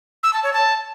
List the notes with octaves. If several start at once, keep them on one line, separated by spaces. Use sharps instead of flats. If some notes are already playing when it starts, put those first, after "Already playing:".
E6
A5
C#5
A5